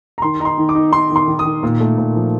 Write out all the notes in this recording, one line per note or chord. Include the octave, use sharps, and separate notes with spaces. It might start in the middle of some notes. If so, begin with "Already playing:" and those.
A#5
D#3 C6
D#4 A#5
C6
D#3
D6
D#4
D#4 C6
D#3
C6
D#3
D#6
D#3
A#2
A3
A#2
F3